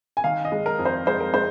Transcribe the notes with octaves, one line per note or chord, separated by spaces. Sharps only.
G#5
D#3 F5
D#5
G#3
A#4
F2
C5
G#3 C5
A#4
G#3 C5